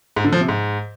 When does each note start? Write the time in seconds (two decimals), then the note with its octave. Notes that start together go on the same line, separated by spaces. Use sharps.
0.16 G#2
0.24 D3
0.32 F3
0.41 C3
0.49 G#2